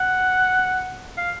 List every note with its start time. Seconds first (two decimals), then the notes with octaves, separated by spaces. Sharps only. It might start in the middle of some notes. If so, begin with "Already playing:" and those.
Already playing: F#5
1.18 F5